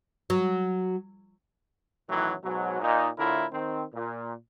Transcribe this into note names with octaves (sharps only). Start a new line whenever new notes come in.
F#3
F#2 A2 D#3 E3 F#3
G#2 B2 F#3
A#2 D#4
A2 D3 E4 F4 A#4
D#3 C4
A#2